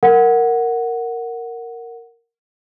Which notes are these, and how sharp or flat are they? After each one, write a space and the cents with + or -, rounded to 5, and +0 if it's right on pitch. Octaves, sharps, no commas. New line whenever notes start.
A#4 -10 F#5 +0